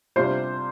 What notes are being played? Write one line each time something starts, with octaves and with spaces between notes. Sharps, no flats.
C3 G3 D4 F4 C5 C6